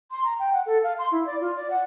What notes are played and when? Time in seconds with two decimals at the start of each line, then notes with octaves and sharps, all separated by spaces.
0.11 C6
0.24 A#5
0.39 G5
0.53 F#5
0.66 A4
0.83 F5
0.98 C6
1.12 E4
1.26 D5
1.41 F4
1.56 D5
1.70 F#5